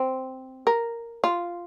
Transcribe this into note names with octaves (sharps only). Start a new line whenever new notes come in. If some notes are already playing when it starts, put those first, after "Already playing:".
Already playing: C4
A#4
F4